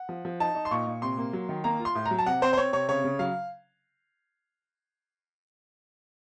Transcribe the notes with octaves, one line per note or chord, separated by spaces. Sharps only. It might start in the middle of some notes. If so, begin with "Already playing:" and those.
Already playing: F#5
F3
F3
D#4 A5
D#4
C6
A#2 C#6
A#2
C3 C6
A#3
F#3
D#3
A#3 A#5
F4
C6
A2
A#5
F#3
A5
C3 F#5
C4 C5
C5
C4 C#5
C3 C#5
C#3 C#5
C#3
F#3 F5